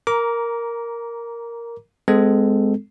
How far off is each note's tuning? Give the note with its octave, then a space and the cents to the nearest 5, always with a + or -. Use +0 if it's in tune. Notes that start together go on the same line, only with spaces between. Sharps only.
A#4 +0 A#5 +15 D6 -20
G#3 +0 C4 -40 A4 +0